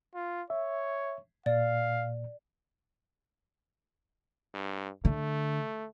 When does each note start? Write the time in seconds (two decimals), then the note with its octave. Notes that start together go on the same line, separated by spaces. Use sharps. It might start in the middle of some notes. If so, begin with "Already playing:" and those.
0.15 F4
0.50 C#5 E5
1.46 A#2 D5 F5
4.54 G2
5.05 D3 A3